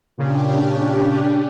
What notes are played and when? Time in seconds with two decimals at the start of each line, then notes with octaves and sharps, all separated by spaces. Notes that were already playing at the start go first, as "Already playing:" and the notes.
0.17 A#2 C#3 C#4 D4 G4